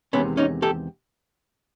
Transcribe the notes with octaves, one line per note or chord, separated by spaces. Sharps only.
E2 C3 D#3 G#3 B3 C#4
C#4 D#4
G4 A4